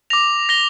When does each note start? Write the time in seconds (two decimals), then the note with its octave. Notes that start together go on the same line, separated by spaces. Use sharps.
0.10 D6 A#6 F7
0.49 A#6 G7